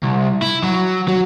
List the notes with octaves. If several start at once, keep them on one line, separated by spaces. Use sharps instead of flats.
C2
E4
F#3
F#3